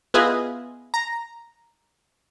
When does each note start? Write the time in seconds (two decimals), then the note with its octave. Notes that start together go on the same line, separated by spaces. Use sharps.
0.14 B3 E4 F4 G#4 B4 D#5
0.94 A#5